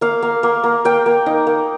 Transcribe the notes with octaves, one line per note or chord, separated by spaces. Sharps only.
A#3 F5
A#3
A#3
A#3
A#3 G5
A#3
D#4
A#3